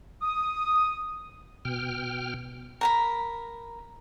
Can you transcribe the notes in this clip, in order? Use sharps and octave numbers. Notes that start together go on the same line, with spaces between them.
D#6
B2 G5 F6
A#4 A#5 B5